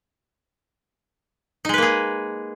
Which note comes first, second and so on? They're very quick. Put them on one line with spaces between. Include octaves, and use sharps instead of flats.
D#4 G#3 B4 A#3 G#4